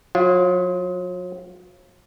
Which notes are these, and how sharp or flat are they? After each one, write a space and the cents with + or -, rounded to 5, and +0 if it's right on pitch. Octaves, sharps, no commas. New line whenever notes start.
F#3 -45 F4 -10